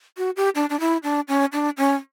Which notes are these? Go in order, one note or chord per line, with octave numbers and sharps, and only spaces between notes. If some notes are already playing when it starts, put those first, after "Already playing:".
F#4
G4
D4
D4
E4
D4
C#4
D4
C#4